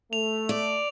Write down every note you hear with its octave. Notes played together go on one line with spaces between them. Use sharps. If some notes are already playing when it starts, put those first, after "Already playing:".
A3 F7
D5